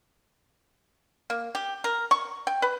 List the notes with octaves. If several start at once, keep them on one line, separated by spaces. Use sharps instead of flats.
A#3
G4
A#4
C#6
G5
B4